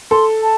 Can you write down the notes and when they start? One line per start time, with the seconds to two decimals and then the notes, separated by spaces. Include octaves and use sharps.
0.11 A4 C6
0.43 A5